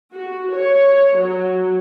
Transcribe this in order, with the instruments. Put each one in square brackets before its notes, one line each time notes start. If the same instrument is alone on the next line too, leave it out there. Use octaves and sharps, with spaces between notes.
[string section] F#4
C#5
F#3